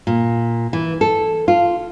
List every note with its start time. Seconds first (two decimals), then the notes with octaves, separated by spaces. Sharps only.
0.07 A#2
0.73 E3
1.01 A4
1.48 F4